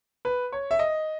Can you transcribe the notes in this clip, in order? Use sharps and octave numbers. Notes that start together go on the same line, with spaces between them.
B4
C#5
E5
D#5